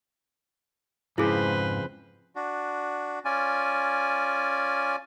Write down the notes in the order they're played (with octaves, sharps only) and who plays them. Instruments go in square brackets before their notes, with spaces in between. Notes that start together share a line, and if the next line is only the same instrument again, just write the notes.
[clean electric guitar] F2 C#3 [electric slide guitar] G#2 [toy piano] E4 G#4 [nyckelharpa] B4 C5
[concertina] D4 F#4
C#4 F4 D5 G#5